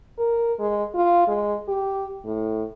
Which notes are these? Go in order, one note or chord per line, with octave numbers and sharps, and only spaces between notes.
A#4
G#3
F4
G#3
G4
A2